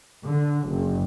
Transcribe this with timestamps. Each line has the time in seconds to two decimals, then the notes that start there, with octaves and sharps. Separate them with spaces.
0.25 D3
0.68 F#1